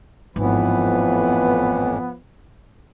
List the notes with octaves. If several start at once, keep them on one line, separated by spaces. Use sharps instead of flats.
G#1 F2 A2 E3 F3 B3 B4